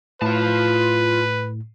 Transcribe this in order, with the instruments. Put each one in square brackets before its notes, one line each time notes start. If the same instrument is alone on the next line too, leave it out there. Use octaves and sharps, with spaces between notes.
[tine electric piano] A2 [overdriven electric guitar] F4 A5 [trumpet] B4